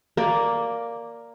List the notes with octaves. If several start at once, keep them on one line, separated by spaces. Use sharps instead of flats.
A#3 D5